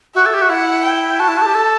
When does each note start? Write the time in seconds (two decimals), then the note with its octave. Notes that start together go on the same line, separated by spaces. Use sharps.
0.15 F#4 E5
0.26 A4
0.34 G4
0.42 F#4
0.49 E4 F#5
0.85 G5
1.19 F#4 A5
1.28 E4
1.37 F#4
1.42 A4
1.46 G4
1.55 A4